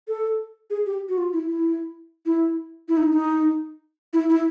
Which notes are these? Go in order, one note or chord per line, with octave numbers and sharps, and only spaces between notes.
A4
G#4
G4
F#4
F4
E4
E4
E4
E4
D#4
D#4
E4
E4